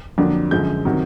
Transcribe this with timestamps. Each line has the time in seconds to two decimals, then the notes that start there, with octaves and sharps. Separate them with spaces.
0.18 F2 D3 F#3 A#3 D4
0.51 F#2 D3 F3 G#3 G6
0.85 C3 D#3 F#3